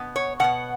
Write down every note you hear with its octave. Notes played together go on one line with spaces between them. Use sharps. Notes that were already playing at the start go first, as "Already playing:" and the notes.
Already playing: B2 B3
C#5
B2 B3 F#5